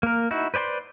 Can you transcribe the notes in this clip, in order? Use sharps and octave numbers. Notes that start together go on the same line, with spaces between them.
A#3 A#4
D#4 E4 F#4
B4 C5 D5 G#5 C6